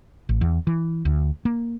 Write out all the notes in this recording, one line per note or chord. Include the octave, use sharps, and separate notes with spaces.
A1
E2
E3
D2
A#3